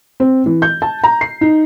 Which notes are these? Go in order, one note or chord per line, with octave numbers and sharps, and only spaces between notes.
C4
E3
G6
A5
A#5
C7
D#4